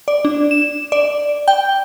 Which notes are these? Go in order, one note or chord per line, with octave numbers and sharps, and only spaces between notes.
D5
D4
E7
D5
G5